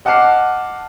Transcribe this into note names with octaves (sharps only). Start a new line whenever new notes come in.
D#5 F#5 A5 D6 F6 C7